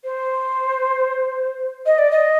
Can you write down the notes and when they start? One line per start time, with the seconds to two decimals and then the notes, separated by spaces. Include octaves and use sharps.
0.04 C5
1.86 D#5
1.98 D5
2.11 D#5